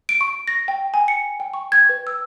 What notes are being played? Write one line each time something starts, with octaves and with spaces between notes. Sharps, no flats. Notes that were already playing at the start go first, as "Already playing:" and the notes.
D7
C#6
A#6
G5
G#5
C#7
G5
C#6
G#6
B4
E6